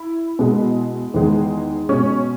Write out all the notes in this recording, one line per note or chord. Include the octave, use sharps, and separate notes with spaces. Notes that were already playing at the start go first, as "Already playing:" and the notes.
Already playing: E4
B2 G#3
E2 D#3 G#3
B2 G#3 C#4